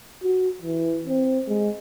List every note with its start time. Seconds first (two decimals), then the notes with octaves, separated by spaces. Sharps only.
0.23 F#4
0.62 E3
1.06 C4
1.48 G#3